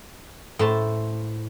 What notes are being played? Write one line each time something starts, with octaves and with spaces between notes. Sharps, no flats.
A2 C5 A5